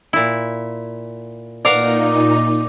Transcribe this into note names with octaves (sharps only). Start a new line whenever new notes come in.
A#2 E4
A#2 D#4 A#4 D5 F5 F#5